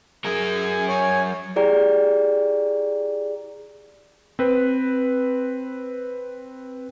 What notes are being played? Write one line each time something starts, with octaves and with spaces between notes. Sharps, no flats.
F#3 G#4 A#4 G#5
C#5 G#5
E4 G4 G#4 D5 G5 A#5
C4 B4